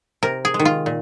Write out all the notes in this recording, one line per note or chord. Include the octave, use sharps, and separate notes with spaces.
C3 A#4
G#4
G#3
D#3
F4
A#2